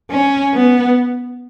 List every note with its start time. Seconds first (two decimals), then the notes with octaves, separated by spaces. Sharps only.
0.11 C#4
0.54 B3